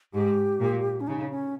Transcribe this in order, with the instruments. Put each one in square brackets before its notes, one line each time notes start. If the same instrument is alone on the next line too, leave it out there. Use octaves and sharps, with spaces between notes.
[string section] G#2 [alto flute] G4
[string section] A#2
[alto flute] C#4
[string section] C#3 [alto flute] D#4
[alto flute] C#4